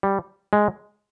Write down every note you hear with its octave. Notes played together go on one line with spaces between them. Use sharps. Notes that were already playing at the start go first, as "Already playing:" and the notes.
G3
G#3